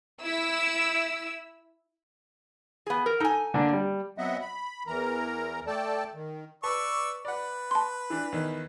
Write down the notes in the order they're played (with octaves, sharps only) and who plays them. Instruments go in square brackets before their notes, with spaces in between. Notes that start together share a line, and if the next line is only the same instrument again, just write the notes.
[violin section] E4 E6
[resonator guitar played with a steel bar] B3 G#4
A#4
[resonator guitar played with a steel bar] D#4 G#5 [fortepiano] A4
[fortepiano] D3 A#3 D4
G3
[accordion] F#3 B3 C4 D#5 E5 F#5
B5
E2 E3 A#4 A#5
A3 A4 D5 G5 A5
D#3
[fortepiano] B4 A5 [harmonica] D5 C#6 E6
[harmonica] B4 [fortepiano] D5 F#5
[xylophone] A5 C6
[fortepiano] E3 D4
E2 D#3